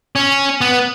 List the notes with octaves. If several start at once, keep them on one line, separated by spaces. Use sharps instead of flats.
C#4
B3